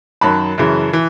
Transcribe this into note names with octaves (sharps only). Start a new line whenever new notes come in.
F#2 D#3 F#3 A5 B5
F#2 C#3 E3
E3